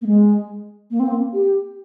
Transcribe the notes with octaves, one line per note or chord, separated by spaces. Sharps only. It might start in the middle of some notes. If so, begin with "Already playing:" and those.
A#3
G#3
A#3
C4
A#3
G4